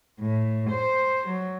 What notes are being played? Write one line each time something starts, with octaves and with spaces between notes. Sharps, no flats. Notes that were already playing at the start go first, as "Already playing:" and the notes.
A2
C5
F#3